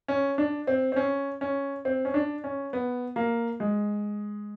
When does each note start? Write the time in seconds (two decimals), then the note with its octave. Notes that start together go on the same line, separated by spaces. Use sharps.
0.08 C#4
0.38 D4
0.67 C4
0.92 C4
0.96 C#4
1.41 C#4
1.85 C4
2.05 C#4
2.14 D4
2.44 C#4
2.73 B3
3.16 A#3
3.60 G#3